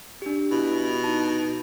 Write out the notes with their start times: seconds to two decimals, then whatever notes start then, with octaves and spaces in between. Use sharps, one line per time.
0.22 D4 G4
0.51 B2 E4
1.04 D#4 A5